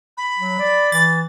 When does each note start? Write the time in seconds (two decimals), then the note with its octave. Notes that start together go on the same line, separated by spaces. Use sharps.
0.17 B5
0.39 F#3
0.59 D5
0.92 E3 A6